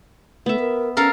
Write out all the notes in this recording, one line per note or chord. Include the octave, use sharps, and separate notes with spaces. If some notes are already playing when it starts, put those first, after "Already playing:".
A3 B3 E5
A#4
C#4 A4 A#4 F5